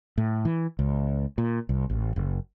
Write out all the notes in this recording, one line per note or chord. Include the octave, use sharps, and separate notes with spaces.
A2
E3
C#2
A#2
C2
A1
F#1